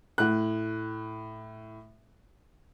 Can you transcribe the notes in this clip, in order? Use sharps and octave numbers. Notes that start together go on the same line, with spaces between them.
A2 F#6